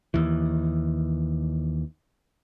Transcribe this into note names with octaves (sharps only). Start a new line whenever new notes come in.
D#2 E3